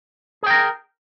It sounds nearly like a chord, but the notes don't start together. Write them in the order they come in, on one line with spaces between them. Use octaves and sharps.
G#4 G5 A#4